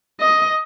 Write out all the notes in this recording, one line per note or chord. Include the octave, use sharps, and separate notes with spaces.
D#5